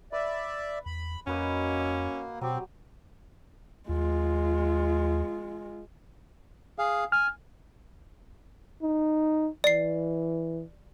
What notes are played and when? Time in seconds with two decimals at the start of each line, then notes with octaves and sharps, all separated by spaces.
0.12 B4 D5 E5
0.86 E2 B5
1.27 F2 A#3 C#4 F#4 B4 D#5
1.80 E6
2.41 B2 F#3 C4 G4
3.89 D#2 G#3 F4
6.78 G#4 F5
7.12 G#5 F6
8.83 D#4
9.64 E3 D5 C7